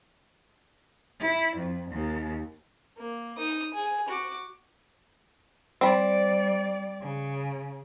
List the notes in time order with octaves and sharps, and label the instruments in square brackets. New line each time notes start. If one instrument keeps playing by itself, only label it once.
[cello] E4
F2
D#2
[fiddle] A#3
D#4 D#6
G#4
F#4 D6
[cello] G3 D5 [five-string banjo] C4 B5
[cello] C#3